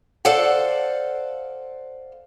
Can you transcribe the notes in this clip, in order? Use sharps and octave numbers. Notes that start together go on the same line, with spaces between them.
A4 C5 D5 F5 F#5